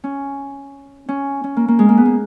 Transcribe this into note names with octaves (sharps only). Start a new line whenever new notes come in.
C#4
C#4
C#4
A#3
A#3
G#3
A#3
B3
A#3